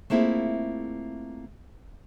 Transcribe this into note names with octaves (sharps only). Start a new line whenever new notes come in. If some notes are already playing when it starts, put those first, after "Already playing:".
A3 A#3 C4 E4 F4 G#4